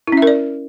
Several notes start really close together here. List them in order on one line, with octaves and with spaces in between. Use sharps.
E4 C#4 E5 A#4 D5